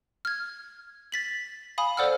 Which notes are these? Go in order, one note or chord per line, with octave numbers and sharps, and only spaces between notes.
F6 G#6
A6 B6 F#7
F5 G#5 B5 D#6
A4 C5 D5 F#5 E6 F6